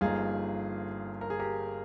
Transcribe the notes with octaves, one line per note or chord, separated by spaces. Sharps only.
G1 G2 F3 A#3 D#4 F4 G#4
A#4
G#4
G4 A#4